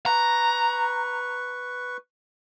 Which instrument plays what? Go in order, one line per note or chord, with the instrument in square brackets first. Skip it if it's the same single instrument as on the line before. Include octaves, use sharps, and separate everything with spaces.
[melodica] B4 C#6 [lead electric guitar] A#5